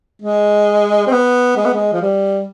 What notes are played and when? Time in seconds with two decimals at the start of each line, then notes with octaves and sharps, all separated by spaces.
0.22 G#3
1.07 C4
1.12 B3
1.57 G#3
1.65 B3
1.73 G#3
1.93 F3
2.02 G3